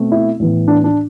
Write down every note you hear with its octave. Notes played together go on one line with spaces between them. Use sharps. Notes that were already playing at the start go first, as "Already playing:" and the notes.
Already playing: B2 A3 C4
E4
A2 E3 B3
D4
D4